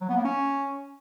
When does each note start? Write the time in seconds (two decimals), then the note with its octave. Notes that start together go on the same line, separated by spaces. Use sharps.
0.01 F#3
0.09 B3
0.17 A#3
0.24 C#4